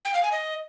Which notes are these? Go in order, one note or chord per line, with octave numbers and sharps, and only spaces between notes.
G5
F5
G#5
D#5